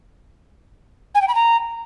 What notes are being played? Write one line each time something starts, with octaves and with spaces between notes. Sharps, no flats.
G#5
G5
B5
A#5